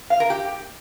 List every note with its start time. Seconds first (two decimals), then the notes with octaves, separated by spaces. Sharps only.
0.10 F5
0.20 A#4
0.30 G4